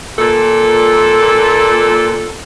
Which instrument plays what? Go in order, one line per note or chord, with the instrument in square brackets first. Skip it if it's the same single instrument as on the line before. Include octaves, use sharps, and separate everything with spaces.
[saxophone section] A#2 A4